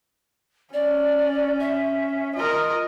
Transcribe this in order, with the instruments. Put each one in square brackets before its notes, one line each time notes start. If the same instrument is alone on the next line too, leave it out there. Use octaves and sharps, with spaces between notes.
[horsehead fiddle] C#4 [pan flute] D5
[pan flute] E5
[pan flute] F4 [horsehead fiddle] A#4 D#5